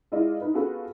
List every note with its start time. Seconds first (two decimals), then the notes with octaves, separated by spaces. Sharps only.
0.12 G#3 E4 F4 D5 D#5
0.41 D#4 B4
0.54 B3 F4 F#4 G#4 A4 B4